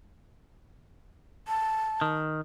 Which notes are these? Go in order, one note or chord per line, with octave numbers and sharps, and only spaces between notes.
A5
D#3